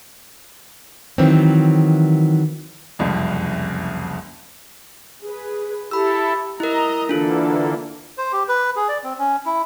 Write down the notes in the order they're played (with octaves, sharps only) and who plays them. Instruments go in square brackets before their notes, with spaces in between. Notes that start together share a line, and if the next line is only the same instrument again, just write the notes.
[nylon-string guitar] D#3 E3 F#3 C4
[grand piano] F#1 C2 F2
[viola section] G#4 B4
[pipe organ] E4 A4 [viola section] G4 [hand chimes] B5 E6
[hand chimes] E4 A#4 [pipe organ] D#5 [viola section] A#5
[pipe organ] D3 E3 A#3 [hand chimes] D4 F4 [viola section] A4
[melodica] C5
G4
B4
G#4
D5
C4
C#4
E4